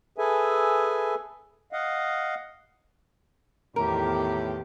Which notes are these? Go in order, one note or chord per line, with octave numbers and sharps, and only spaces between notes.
G#4 A4 B4 E5 G#5
D#5 F5 F#5
E2 A2 D#3 G4 A#4